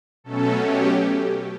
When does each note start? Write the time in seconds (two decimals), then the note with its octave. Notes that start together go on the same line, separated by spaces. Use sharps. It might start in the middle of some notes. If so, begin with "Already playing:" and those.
0.24 B2 F#3 A3 C#4 A4
0.63 G4